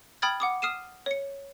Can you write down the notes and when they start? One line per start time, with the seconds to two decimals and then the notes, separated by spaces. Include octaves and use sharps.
0.22 G5 B5 D#6 F6 G#6 A6
0.40 F#5 D6 D#6
0.62 D#6 F6 C7 D#7 E7
1.06 C#5 C#7